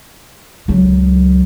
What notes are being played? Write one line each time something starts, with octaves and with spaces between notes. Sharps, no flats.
C#2 F#3